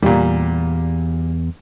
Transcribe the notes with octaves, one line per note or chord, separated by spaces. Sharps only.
E2 A#2 G3 E4 A#5